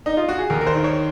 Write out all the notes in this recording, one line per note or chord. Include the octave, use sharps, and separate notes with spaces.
D#4
F4
F#4
G#4
D#2 A#4
A#4
C5
D#3
C#5